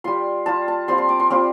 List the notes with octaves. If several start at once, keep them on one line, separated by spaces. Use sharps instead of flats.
G3 F4 C6
G3 F4 A5
A5
G3 C4 F4 C6
C6
D6
C6
G3 C4 F4 D6